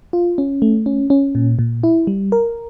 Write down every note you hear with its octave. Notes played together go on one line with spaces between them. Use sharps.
F4
C#4
A3
C#4
C#4
A#2
A#2
E4
G3
A#4